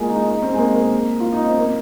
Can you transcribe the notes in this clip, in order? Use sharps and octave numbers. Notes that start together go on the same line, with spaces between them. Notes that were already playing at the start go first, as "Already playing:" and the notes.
Already playing: G#3 A#3 F4
D#4
D#4
C4
G#3
A#3
A#3
F4
D#4
C4
A#3